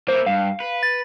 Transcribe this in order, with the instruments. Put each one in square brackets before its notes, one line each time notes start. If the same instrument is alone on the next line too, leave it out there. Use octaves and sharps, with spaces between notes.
[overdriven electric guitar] A#3 E4 [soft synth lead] C5
[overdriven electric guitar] G2 [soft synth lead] F5
[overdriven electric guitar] B4
[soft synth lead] A6